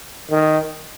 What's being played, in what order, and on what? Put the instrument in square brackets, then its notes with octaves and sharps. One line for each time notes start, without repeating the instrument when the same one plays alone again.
[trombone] D#3